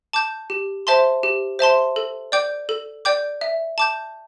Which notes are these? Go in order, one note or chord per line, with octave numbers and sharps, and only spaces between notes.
A5 D6 G6
G4
C5 E5 A5 C6
G4
C5 E5 A5 C6
A4
D5 G5 D6 G6
A4
D5 G5 D6 G6
E5
A5 D6 G6